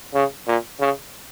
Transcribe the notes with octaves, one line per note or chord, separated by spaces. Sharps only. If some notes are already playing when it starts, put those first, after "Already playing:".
C#3
A#2
C#3